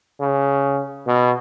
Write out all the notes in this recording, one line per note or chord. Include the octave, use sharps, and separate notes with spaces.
C#3
B2